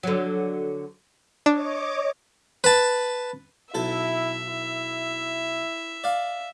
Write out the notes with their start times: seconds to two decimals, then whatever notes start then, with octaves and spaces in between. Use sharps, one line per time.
0.03 D3 F#3
1.46 D4 C#5 D#5 D6
2.64 B4 A5
3.75 B1 E4 A4 E5
4.49 E4
6.04 D5 F5